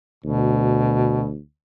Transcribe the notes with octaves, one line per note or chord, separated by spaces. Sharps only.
D2 B2